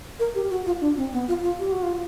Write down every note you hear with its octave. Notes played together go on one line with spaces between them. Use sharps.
A#4
G4
F#4
F4
D4
C4
B3
F4
F4
G4
F#4
F4